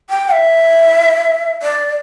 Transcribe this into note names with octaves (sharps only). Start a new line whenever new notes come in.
G5
E5
D5